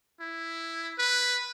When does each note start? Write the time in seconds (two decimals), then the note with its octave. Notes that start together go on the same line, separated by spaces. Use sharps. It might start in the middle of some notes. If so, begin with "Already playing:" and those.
0.21 E4
0.98 B4